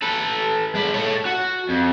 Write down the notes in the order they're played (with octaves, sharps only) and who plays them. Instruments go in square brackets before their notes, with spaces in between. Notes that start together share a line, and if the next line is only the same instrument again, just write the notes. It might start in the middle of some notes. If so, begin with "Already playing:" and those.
[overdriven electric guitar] A4 B4
G#3 B5
A4 C#5
F#4
F2